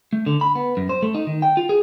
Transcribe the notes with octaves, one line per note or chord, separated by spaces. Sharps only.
A3
D3
B5
B3
F#2
C5
A3
D#4
D#3
G5
F4
G#4